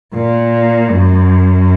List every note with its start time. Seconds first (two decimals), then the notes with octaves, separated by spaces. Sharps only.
0.14 A#2
0.91 F#2